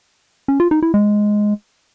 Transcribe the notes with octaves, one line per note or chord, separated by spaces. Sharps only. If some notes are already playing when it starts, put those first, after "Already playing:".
C#4
F4
D#4
E4
G#3